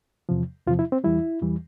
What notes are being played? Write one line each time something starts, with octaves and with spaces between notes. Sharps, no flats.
E2 C3 F3
E2 C3 F3 F4
E4
C4
E2 E3 G3 E4
E2 E3 G3